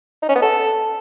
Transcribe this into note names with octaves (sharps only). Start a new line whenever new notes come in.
D#4
C#4
B3
A4